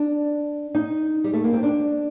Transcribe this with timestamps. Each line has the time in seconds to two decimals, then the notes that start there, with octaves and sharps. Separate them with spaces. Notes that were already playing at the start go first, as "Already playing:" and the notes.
Already playing: D4
0.75 D#4
1.24 G3
1.34 A3
1.44 A#3
1.53 C4
1.63 D4